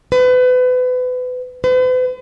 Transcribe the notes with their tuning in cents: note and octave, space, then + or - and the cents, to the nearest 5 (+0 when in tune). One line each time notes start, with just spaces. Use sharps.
B4 +30
B4 +45